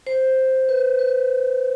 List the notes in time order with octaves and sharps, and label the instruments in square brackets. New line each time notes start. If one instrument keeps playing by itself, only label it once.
[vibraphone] C5
B4
B4